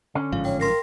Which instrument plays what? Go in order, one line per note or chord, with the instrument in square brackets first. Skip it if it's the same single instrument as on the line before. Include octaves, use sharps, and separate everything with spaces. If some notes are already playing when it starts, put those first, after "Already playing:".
[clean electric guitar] D3 C#4
[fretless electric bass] A1 G#2 F3 [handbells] F5
[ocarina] C#5 [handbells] G5
[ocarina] A#4 [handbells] C6 A#6 C7